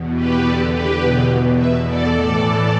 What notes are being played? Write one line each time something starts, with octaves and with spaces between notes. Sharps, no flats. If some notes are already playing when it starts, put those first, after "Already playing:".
Already playing: E2 B2
G4 B4
E2 D3 A4 D5
G4 B4
E2 B2
E2 B2 B4 E5
A4 D5
A2 E3 A4 D5